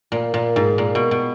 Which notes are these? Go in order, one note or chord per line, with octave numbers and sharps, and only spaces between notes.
A#2
A#2
G#2
A#2
B2
B2